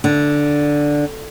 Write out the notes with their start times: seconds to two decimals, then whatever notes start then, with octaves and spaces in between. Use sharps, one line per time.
0.04 D3